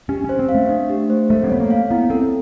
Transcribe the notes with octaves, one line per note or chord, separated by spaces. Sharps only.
C#4 G4
C#4 C5
C4
F5
A3
D4
G4
C5
A3 A4
C4
B3 C#5
A#3
F5
B3 E4
C4 A4